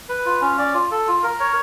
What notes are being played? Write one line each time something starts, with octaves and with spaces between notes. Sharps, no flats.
B4
F4
C#4
D5
F4
A4
F4
A#4
C#5